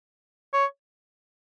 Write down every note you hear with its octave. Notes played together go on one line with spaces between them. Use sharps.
C#5